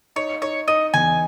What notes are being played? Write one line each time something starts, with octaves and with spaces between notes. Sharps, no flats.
D#4 C#5
D#4 C#5
D#4 D#5
E2 G#5